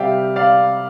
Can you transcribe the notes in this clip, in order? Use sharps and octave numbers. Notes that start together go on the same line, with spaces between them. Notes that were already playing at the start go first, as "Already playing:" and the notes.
Already playing: C3 G3 D5 E5 F5 G5
D5 F5